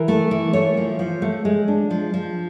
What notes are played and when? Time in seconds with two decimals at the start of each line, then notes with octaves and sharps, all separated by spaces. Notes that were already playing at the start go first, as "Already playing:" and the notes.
Already playing: E3 A#4
0.08 A3
0.31 E3
0.53 A3 C#5
0.77 F3
0.99 F3
1.22 A3
1.45 G#3
1.68 D4
1.91 F3
2.14 F3